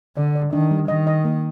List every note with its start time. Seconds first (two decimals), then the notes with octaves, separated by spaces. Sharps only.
0.17 D3 D5
0.35 D5
0.53 D#3 D4
0.71 G3
0.88 D#3 D#5
1.07 D#5
1.25 A#3